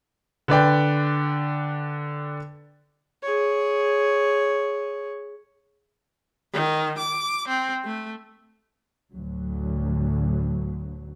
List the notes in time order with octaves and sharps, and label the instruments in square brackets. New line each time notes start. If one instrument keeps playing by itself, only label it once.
[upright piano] D3 B4 D5 G5
[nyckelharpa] G#4 C#5
[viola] D#3
D6
C4
A3
[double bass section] D2 A2 D3 F#3